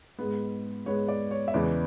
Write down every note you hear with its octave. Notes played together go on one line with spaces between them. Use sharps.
G#2 G#3 B3
G#2 G#3 B3 C#5
D5
C#5
E5
E2 C#3 E3 G#3 B3 D5